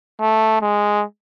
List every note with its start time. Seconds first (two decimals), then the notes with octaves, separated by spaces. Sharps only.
0.20 A3
0.61 G#3